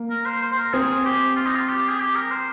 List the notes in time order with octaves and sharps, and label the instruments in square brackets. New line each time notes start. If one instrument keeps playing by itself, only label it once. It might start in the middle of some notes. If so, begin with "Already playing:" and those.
Already playing: [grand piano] A#3
[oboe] A#4
C5
C5
C5
A#4
[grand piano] C4 [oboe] G#4
[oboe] G4
F4
D#4
F4
G4
G#4
G4
A#4
C5